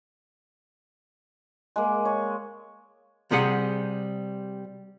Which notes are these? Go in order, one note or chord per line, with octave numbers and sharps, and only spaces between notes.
G#3 A#3
C#5
C3 G3 G#4 F#5